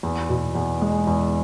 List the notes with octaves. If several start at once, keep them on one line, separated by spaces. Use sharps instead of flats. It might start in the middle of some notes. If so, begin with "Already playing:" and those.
E2
B2
E2
G#3
E2